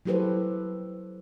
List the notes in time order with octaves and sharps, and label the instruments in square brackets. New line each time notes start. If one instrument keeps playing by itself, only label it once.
[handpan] F#3 E4 G4 A4 B4 C5